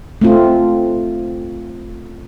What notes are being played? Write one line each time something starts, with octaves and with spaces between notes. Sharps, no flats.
A3 C4 F4